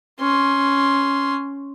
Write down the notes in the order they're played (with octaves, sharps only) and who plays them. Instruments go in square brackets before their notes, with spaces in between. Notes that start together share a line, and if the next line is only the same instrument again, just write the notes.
[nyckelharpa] C#4 C6